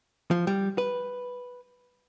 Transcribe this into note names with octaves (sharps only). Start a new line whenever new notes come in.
F3
G3
B4